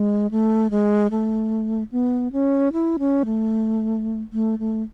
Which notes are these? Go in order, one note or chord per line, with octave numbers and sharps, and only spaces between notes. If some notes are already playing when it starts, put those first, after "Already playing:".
Already playing: G#3
A3
G#3
A3
B3
C#4
E4
C#4
A3
A3
A3